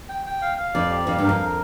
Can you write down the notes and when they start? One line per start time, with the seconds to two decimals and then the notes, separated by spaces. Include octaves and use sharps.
0.09 G5
0.26 G5
0.42 F5
0.58 F5
0.74 F2 D5
0.90 G4
1.07 F2 F5
1.19 G2
1.24 A#4
1.29 F2
1.40 A#4